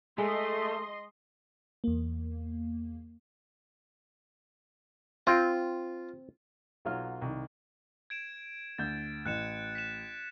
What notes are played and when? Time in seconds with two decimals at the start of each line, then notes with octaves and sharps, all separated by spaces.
0.18 G#3 A3 D#5 C6
1.84 E2 A#3
5.27 C4 F4
6.85 B1 F#3 F4 F#4 F6
7.22 C2 D#3
8.10 G#6 D7 E7
8.78 D2 G6 A6
9.26 A1 F#6 C#7 E7
9.75 B6 E7